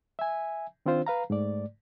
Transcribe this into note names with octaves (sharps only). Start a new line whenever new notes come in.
E5 G#5
D#3 C4 D4 F4 C5
B4 F5 A#5
G#2 A3 D5